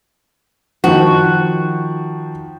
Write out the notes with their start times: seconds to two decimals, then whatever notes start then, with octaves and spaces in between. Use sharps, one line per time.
0.84 D#3 F3 F#4